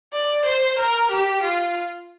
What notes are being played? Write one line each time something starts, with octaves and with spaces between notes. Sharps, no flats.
D5
C5
A#4
G4
F4